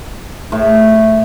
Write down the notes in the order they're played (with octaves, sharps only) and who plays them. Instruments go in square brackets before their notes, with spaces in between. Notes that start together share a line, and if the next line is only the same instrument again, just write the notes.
[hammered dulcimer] A2